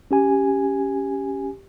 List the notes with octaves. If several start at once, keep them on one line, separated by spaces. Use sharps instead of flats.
C#4 G4 G#5